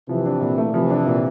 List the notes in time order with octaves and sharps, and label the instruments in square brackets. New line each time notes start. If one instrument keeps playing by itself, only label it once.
[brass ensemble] C3 E3 [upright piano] F3
[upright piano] D4
A#2
A3
[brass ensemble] C3 E3 [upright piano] F3
[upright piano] D4
A#2